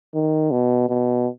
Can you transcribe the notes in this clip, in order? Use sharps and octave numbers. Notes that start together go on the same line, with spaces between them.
D#3
B2
B2